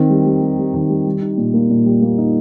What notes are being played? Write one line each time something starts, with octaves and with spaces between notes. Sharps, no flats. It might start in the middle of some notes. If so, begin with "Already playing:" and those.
Already playing: D#3 C4
G3
G3
G3
G3
D#3
G3
G3
D#4
A#2
A#3
A#2
G3
A#3
D#4